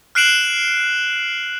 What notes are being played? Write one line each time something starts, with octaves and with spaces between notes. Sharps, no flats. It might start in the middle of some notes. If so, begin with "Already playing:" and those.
F6 F#6 C7 D7 E7 F#7